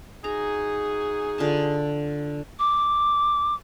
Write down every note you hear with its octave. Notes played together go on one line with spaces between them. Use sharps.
D#4 F#4 G#4 A#5
D3 F4 A5
D6